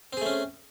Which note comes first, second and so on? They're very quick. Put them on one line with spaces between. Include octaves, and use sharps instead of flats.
C4 G#4 A3 C#4